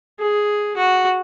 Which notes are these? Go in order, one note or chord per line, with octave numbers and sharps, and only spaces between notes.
G#4
F#4